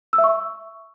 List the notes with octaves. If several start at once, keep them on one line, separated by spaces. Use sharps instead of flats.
E6
E5
C#6